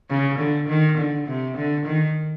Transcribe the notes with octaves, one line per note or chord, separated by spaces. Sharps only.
C#3
D3
D#3
D3
C3
D3
D#3